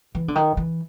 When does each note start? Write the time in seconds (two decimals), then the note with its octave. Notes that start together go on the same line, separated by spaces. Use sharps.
0.15 E3
0.28 D3
0.35 D#3
0.57 E3